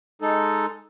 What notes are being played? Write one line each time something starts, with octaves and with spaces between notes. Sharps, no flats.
G#3 D#4 A4